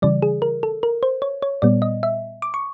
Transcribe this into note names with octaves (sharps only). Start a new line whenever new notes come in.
C#3 E3 G3 D5
G#4
A#4
A4
A#4
C5
C#5
C#5
A#2 G3 B3 D5
D#5
E5
D6
C#6